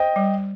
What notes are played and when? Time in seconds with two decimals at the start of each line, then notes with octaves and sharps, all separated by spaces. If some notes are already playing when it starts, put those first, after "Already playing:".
Already playing: C5 D#5 G5
0.16 G3